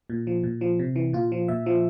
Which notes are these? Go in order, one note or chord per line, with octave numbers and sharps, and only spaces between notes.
A#2
F3
A#2
F3
C3
E3
A#2 F4
F3
A#2 E5
F3